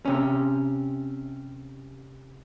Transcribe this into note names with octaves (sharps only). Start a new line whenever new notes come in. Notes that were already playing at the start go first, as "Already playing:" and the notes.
C3 C#4